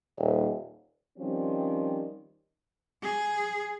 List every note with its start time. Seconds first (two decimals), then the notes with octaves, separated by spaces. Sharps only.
0.18 D#1
1.18 D#3 F3 G3 C4 C#4
3.03 G#4